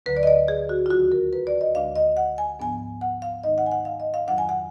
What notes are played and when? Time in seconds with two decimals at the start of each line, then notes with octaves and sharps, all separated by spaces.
0.06 D2 D3 F#3 B4
0.17 D5
0.23 D#5
0.27 D5
0.48 G#4
0.69 F#4
0.86 F4
0.90 D#2 D#3 F#3 F#4
1.12 A#4
1.33 B4
1.47 D5
1.61 D#5
1.74 D2 D3 G#3 D4 F5
1.96 D#5
2.17 F#5
2.38 G#5
2.59 G#2 F3 B3 D4 G#5
3.01 F#5
3.22 F5
3.43 G#2 D#3 G#3 D#4 D#5
3.58 F#5
3.66 G#5
3.71 F#5
3.85 F5
4.00 D#5
4.14 F5
4.28 F2 D#3 F#3 D4 F#5
4.38 G#5
4.49 F#5